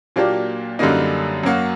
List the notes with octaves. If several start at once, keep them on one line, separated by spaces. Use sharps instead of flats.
A#2 F#3 A#3 D4 G4
F#2 D3 G3 A#3 D#4
F#2 F#3 A#3 F#4